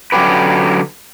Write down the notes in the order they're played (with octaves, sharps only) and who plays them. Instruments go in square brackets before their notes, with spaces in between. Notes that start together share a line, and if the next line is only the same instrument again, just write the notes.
[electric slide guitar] D3 F#3 A#3 C#4 G4 B4